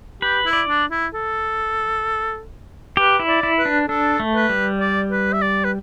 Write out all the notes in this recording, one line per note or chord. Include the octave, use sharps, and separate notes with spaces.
G4 B4
E4
D5
D4
E4
A4
G4 B4
E4
D5
E4
B4
D4
D4 A4
A3
B4
G3
D5
B4
E5
D5
B4